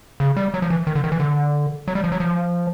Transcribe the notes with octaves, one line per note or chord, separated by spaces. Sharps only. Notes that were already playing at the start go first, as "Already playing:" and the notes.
C#3
G3
F#3
F3
E3
D#3
D3
D#3
E3
D3
F#3
G3
F3
F#3
F3